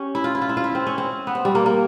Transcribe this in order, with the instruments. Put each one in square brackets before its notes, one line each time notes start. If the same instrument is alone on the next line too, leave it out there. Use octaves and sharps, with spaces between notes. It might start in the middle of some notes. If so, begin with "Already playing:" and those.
Already playing: [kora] C#4 G4
E4
F4
E4
F4
E4
F4
E4
C4
C#4
C4
B3
C4
G3
A#3
A#3